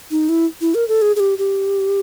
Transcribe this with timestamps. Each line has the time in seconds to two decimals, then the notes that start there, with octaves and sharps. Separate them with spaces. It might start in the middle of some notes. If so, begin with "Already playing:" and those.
0.11 D#4
0.29 E4
0.61 E4
0.75 A#4
0.88 A4
1.02 G#4
1.16 G#4
1.20 G4
1.38 G4